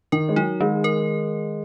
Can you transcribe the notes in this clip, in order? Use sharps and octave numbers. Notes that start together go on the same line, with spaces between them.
D#3 A#4
G#3
F#3 D#4
D#3 G#3
A#4